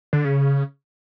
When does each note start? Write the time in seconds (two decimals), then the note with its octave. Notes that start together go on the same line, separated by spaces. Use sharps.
0.13 D3
0.24 C#3